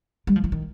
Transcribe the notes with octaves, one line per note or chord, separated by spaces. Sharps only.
G3
F3
E3
D#3